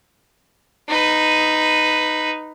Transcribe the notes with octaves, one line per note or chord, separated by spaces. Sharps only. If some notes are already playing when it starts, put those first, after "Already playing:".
D#4 B4